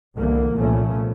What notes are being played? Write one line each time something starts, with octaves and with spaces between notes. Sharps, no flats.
C2 D3 E3 A#3
C2 A#2 F3 A3 B3 C#4